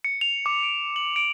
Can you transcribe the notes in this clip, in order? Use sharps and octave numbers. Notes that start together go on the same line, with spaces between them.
C#7
F7
D6
D7
F#7
D7